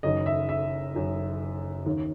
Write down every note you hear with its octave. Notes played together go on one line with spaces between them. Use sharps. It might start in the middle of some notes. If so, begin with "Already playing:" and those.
F#1 F#2 D#3 D#5
E5
E5
F#1 F#2 D#3
D#2 D#3